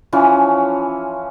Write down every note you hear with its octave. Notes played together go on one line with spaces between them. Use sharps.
E3 F3 C#4